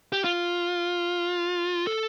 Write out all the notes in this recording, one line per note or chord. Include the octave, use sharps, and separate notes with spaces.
G4
F4
A4